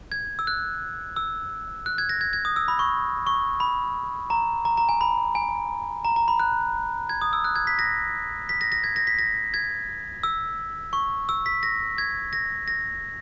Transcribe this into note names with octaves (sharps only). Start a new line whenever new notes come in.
G#6
E6
F#6
E6
F#6
G#6
A#6
G#6
G#6
D#6
E6
B5
C#6
C#6
B5
A#5
A#5
A#5
G#5
B5
G#5
A#5
A#5
B5
F#6
G#6
D#6
E6
F#6
G#6
B6
A#6
B6
A#6
A#6
G#6
A#6
B6
A#6
G#6
E6
C#6
E6
B6
A#6
G#6
A#6
A#6